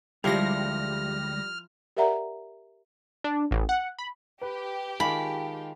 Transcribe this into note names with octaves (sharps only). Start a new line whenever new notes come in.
D2 F3 G3 G#3 E4 F6 A#6
G4 A#4 D5 E5 F#5 A#5
D4
A1
F#5
B5
G4 B4
D#3 G#3 F4 F5 G#5 A5 B5